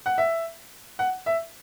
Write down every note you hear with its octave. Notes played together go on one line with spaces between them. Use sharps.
F#5
E5
F#5
E5